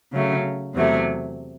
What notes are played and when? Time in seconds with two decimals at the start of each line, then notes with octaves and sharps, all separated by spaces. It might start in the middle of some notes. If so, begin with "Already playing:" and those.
0.12 C#3 F#3 A3
0.74 E2 C3 F#3 A3